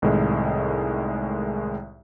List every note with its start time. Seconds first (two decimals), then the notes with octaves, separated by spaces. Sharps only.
0.02 C2 A2 D#3 G#3